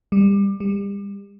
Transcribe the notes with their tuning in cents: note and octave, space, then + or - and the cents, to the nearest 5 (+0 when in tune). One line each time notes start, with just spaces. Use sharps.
G3 +25
G3 +35